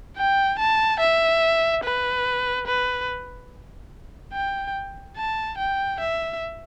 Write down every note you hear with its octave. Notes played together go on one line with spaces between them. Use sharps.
G5
A5
E5
B4
B4
G5
A5
G5
E5